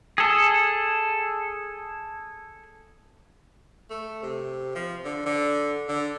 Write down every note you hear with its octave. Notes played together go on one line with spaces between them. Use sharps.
G#4 A4
A3
C3
F3
D3
D3
D3